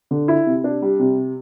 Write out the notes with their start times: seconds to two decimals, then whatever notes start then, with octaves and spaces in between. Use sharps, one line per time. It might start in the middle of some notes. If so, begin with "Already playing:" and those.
0.11 D3
0.28 E4
0.46 C3
0.64 D4
0.82 G3
0.99 C3